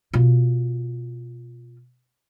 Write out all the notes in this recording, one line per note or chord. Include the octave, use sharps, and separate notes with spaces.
B2 F4